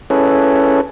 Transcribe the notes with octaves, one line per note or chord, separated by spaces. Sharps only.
C#4 E4 G#4 A4 B4 C#5